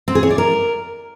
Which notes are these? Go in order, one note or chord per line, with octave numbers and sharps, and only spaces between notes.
C4
G#4
C#5
D5
A#4